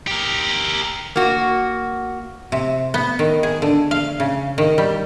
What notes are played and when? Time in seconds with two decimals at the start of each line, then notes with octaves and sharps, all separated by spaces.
0.07 G4 A#4
1.16 A#3 F#4
2.52 C3
2.94 B3
3.19 D#3
3.43 G#4
3.62 D3
3.91 F5
4.20 C#3
4.58 D#3
4.78 G3